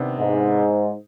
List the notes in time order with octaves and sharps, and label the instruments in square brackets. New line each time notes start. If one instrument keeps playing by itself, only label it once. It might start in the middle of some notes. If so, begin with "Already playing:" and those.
Already playing: [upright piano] C3 D#3 B3 D4
[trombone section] G#2